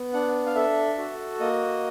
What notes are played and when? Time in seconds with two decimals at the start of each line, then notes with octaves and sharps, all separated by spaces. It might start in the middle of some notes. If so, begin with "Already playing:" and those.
Already playing: B3
0.13 D4 F#5
0.46 F5
0.55 A4 E5
0.98 F#4
1.40 A#3 D#5